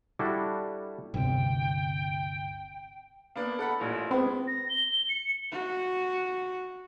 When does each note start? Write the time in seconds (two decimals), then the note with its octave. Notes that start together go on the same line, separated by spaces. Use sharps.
0.19 G3 D4 E4 F#4 A4
1.14 G1 D2 C3 G5
3.36 A#3 B3 D4
3.59 A4 F#5 B5
3.80 A1 A#2
4.11 G#3 B3 C4
4.47 A#6
4.70 G7
4.92 G7
5.09 C#7
5.51 F#4